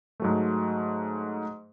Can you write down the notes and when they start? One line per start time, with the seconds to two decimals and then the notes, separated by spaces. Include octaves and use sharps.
0.20 G#2 F#3 A3